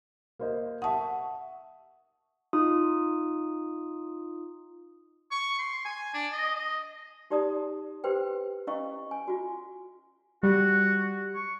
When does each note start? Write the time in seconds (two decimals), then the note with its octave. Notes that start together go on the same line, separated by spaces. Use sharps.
0.39 A#3 C5 D#5
0.82 E5 F#5 A5 C#6 D#6
2.53 D#4 F4 D#6
5.31 C#6
5.59 C6
5.85 G#5
6.14 D4
6.32 D#5
6.55 D#5
7.30 D#4 G4 D5 A5 D#6
8.04 G4 B4 C5 G5
8.67 C#4 E4 D#5 F5 C#6
9.11 G#5
9.28 F4 F#4
10.43 G3 F#4
11.35 C#6